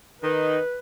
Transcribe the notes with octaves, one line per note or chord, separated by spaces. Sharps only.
D#3 D#4 B4